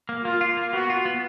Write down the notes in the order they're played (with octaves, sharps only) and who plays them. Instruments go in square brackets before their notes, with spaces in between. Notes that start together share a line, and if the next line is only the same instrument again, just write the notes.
[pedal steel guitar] A#3
[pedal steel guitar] A#3 [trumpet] F4
[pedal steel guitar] F4
A#3
[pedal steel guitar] B3 [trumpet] F#4
[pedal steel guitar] F4
B3